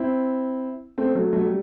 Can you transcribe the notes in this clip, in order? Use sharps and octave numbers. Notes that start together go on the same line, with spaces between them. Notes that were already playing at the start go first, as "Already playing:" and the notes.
Already playing: C4 E4
A3 C4
F#3 A3
F#3 A3
G3